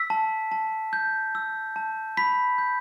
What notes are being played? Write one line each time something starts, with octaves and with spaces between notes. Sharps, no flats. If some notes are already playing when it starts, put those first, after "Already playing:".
Already playing: E6 B6
A5
A5
G6
E6
A5
B5 B6
G6